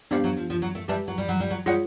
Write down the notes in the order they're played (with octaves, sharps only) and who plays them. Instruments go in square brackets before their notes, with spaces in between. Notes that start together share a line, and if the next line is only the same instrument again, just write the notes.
[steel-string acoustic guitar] G3 [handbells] B3 D4 G4 C5 F5
[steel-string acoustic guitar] F#3
F3
F3
F#3
A3
[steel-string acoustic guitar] G3 [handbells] G4 B4 E5 A5
[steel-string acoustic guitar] F#3
G3
F#3
G3
F#3
[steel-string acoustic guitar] G3 [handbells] F4 G#4 C#5 F#5